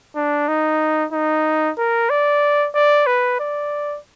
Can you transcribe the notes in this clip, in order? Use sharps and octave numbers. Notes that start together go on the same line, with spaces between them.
D4
D#4
D#4
A#4
D5
D5
B4
D5